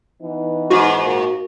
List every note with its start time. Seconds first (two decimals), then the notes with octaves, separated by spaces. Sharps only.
0.21 E3 B3 D#4
0.70 G#2 F4 F#4
1.04 A#2 A#3 A#4